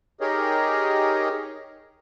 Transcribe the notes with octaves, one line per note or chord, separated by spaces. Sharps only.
D#4 G4 G#4 A#4 C#5 D#5